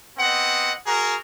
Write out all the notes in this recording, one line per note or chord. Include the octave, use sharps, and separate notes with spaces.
B3 C4 D#5 F#5
F#4 G#4 A#4 A#5